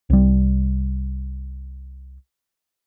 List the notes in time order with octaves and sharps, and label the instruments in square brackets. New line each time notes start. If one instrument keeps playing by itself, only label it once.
[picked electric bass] C2 G3